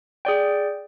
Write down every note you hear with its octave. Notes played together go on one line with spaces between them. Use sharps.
G#4 D5 G5